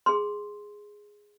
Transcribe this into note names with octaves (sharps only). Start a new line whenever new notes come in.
G#4 C6